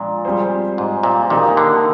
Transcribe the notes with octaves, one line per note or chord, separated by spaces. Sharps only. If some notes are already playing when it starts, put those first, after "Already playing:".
Already playing: A#2 F3 G#3 D4
G3 C4 F4 G#4 C5
G#2
A#2
A#2 D#3 A#3 D#4 G4 A#4
D3